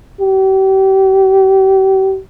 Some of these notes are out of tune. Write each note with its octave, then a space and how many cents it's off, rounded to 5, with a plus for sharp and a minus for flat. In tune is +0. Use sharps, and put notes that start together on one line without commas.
G4 -35